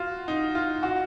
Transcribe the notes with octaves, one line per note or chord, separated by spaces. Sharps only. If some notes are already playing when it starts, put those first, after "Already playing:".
Already playing: F4 F#4
D#4
F4
F#4